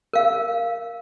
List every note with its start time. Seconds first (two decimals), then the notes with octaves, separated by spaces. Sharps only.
0.13 A#4 F5